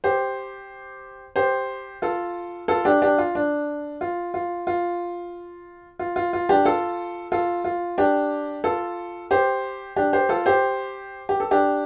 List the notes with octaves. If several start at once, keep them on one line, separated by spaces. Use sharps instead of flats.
G4 C5
G4 C5
F4 A4
F4 A4
D4 G4
D4 G4
F4
D4
F4
F4
F4
F4
F4
F4
D4 G4
F4 A4
F4 A4
F4
D4 G4
F4 A4
G4 C5
D4 G4
G4 C5
F4 A4
G4 C5
G4
A4
D4 G4